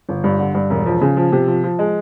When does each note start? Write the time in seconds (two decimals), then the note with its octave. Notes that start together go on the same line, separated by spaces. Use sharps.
0.09 G1
0.24 G2
0.39 D3
0.54 G2
0.70 E1
0.86 F3
1.01 C#3
1.17 F3
1.32 C3
1.48 F3
1.63 F3
1.79 G#3